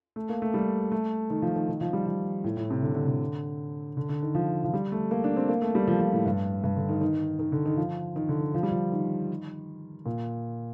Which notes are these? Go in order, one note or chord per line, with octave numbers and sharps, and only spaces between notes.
A3
A#3
A3
G3
A3
D#3
F3
D#3
D#3
F3
G3
F3
A2
A2
C3
D3
D3
D3
D3
D3
D#3
F3
F3
G3
A3
A#3
D4
C4
A#3
A3
G3
F3
F3
A2
G2
G2
D3
D#3
D#3
D#3
D3
D#3
F3
D#3
D3
D#3
F3
G3
F3
D#3
A#2